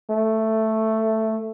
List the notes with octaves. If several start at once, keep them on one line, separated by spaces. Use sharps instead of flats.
A3